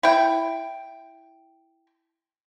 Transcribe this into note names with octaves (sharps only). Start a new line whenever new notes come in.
E4 G5